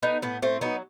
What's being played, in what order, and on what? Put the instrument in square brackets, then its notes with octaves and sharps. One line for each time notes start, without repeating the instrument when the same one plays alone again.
[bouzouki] A3 B3 D#4
A2 B3
A2 A3 C4
F#3 B3 D#4